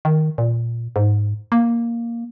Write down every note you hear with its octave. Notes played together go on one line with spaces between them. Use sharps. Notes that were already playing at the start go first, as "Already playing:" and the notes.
D#3
A#2
G#2
A#3